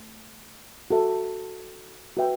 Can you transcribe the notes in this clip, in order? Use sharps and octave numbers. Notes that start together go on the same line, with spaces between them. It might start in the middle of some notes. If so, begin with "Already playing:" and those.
Already playing: A3
F#4 A4 E5
F#4 B4 E5 G5